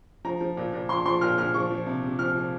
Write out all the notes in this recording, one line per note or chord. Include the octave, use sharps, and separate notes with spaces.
F3 A#5
F3
A#2
A#2
F3 C6
F3 C6
A#2 F6
A#2 F6
F3 C#6
F3
C3
C3
F3 F6
F3